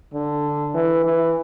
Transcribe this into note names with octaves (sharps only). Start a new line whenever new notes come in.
D3
E3
E3